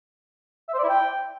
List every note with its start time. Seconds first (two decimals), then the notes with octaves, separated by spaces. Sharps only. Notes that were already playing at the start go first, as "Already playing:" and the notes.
0.68 E5
0.74 C5
0.79 D5
0.84 E4
0.89 G5